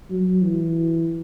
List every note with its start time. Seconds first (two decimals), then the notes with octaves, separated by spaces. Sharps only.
0.10 F#3
0.42 E3